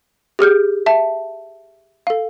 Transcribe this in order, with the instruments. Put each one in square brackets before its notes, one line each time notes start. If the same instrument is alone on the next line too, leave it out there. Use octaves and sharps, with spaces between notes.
[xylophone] G4 G#4 F6 G6
E5 A5
A4 F5